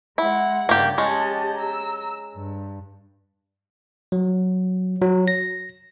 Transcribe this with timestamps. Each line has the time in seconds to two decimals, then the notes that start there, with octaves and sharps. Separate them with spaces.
0.18 G#3 E4 F#5
0.69 G2 C#3 A#3 G4 D5
0.98 G#3 C#4 G4 D#5 A5
1.58 A#5 E6
2.35 G2
4.12 F#3
5.01 F#3
5.28 A#6